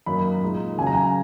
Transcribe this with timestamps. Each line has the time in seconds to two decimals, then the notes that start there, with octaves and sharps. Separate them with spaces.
0.06 F#2 D#3 F#3 A#3 D#4 B5
0.42 A#2 G#3 D#4
0.77 C#3 F#3 C#4 G#5
0.87 A#5
0.95 G#5